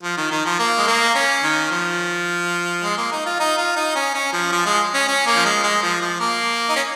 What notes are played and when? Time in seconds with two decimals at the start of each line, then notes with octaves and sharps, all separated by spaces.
0.03 F3
0.17 D#3
0.31 D#3
0.45 F3
0.59 A#3
0.78 G#3
0.87 A#3
1.15 C#4
1.43 D#3
1.71 F3
2.83 G#3
2.97 A#3
3.11 D#4
3.26 F4
3.40 D#4
3.58 F4
3.76 D#4
3.95 C#4
4.14 C#4
4.33 F3
4.52 F3
4.65 G#3
4.94 C#4
5.08 C#4
5.26 A#3
5.36 F3
5.45 G#3
5.64 G#3
5.83 F3
6.01 F3
6.20 A#3
6.69 D#4
6.76 C#4